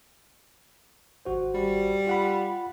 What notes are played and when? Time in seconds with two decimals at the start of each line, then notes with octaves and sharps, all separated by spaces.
1.25 G#1 F#4 C5
1.54 G3
2.07 F4 F#5 B5